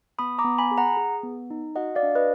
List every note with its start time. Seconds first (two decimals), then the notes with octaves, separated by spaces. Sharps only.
0.19 B3 B5 D#6
0.39 A#5 D6
0.44 B3
0.58 G#5 B5
0.71 G#4
0.78 F#5 A#5
0.97 G#4
1.23 B3
1.50 D#4
1.76 F#4 D#5 F#5
1.95 D5 F5
2.03 D4
2.15 B4 D#5